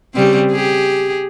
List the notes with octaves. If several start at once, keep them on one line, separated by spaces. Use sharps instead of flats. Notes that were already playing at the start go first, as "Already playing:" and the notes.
C#3 G3 C4
G4 G#4